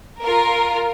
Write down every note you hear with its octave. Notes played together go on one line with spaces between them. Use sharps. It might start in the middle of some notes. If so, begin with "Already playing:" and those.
F4 A#4